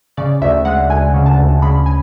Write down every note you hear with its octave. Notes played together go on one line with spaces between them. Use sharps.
C#3 D5
D2 E5
G#3 F#5
D2 G#5
C#3
A5
D2
C#3 B5
G#5